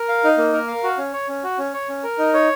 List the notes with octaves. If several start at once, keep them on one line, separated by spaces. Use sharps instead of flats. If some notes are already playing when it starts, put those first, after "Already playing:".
Already playing: A#4
F5
D#4
A#3
A#4
F5
F#4
C#4
C#5
C#4
F#4
C#4
C#5
C#4
A#4
D#4
C#5